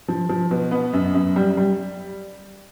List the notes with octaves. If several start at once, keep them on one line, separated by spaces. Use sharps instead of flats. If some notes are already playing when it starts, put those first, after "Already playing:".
F3
F3
B2
B3
F#2
F#2
G3
G3